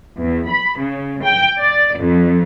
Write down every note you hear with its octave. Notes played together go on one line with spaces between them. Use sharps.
E2
B5
C#3
G5
D5
F2